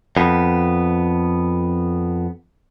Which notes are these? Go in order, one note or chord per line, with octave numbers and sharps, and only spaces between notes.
F2 B3